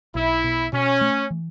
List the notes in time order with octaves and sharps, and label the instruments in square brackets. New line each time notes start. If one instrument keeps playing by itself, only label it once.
[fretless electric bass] B1 [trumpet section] E4
[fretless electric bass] B2
[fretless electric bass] B2 [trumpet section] C#4
[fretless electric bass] A3
E3